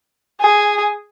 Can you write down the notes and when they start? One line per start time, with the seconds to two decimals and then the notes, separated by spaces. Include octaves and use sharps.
0.41 G#4